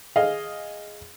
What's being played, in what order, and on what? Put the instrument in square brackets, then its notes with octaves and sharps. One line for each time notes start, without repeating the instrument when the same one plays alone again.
[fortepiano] G#4 D#5 F5